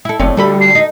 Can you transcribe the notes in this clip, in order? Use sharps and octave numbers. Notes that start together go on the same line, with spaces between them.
E4 A4
F#1 A2 C4 C#5 D5
D2 D3 G3 A4 B5
C7
D#4